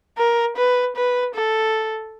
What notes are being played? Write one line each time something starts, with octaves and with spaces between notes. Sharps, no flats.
A#4
B4
B4
A4